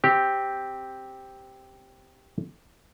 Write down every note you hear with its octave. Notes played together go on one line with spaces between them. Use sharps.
C4 G4